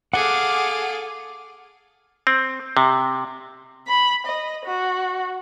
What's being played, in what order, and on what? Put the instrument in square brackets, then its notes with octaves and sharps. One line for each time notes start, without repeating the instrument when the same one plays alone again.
[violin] G#4 A4 [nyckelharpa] F5 D6 [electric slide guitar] F#5
[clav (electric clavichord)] C4
C3
[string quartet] B5
D#5
F#4